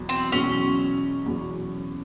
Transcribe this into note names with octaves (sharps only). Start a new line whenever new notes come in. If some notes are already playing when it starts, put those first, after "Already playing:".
Already playing: E2 B2 F#3
C4
E2 B2 F#3 C#4
E2 B2 F#3